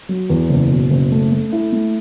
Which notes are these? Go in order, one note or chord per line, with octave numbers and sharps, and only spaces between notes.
F#3
E2
F#1
B2
F#1
A3
A3
E4
A3